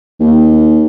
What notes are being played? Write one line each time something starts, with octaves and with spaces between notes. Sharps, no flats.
D#2